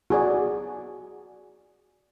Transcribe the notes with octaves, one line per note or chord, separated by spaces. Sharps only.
F#4 G#4 D5